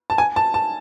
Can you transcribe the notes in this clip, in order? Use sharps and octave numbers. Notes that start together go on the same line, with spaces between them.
A5
G#5
A5
A5